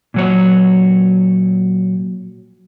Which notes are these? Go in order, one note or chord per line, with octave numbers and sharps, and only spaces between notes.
A#2 F#3 C#5